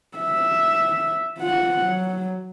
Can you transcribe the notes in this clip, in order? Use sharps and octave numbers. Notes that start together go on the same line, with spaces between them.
E5
F4 F#5
F#3